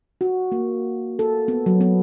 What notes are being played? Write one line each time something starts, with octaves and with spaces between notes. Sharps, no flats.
F#4
A#3
A4
B3
F#3
B3